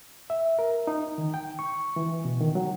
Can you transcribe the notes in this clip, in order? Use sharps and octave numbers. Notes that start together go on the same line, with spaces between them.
E5
A#4
D#4
D#3
G5
C#6
E3
B2
D#3
F#3